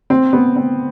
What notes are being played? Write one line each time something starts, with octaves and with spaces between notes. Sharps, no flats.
C4
B3
C4